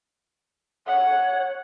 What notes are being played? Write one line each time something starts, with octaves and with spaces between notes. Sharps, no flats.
C#5 F#5